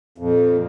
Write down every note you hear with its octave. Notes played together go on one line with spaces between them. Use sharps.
F2 A#2